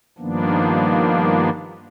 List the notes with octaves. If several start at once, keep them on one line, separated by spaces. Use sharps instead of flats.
G2 D#3 F3 A#3 B3 D4